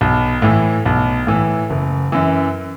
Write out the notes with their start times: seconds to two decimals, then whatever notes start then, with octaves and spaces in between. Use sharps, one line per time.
0.01 B1
0.42 A2 E3
0.86 B1
1.27 A2 E3
1.70 F#1
2.12 F#2 E3